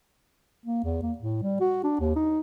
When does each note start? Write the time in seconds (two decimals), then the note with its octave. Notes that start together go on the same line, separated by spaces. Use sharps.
0.66 A#3
0.84 E2
1.03 A#3
1.18 A2
1.42 G3
1.61 F#4
1.84 D4
2.00 D#2
2.16 D#4